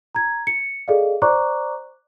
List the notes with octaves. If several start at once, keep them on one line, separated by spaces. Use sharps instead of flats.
A#5 G#6
C#7
G#4 A4 D5 D#5 F5
C5 D5 A#5 C#6 D6 F#6